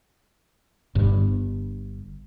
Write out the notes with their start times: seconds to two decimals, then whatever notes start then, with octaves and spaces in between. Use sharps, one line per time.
0.95 G1 G2